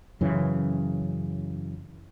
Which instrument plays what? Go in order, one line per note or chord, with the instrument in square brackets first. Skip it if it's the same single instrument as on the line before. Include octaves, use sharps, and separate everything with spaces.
[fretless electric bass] F#2 C#3 E3